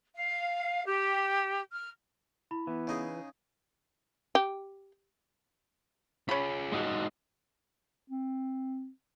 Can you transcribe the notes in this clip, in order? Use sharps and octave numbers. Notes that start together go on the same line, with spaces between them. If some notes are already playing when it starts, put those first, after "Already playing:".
F5
G4
F6
E4 B5
E3 B3
C#3 D#4 G#4
G4
C#4 F4 G#4 B5
G#3 D#4 F#4
C4